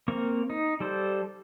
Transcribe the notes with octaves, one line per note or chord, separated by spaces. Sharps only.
A#3 C4 A#4 C#6
D#4
G3 A4 C5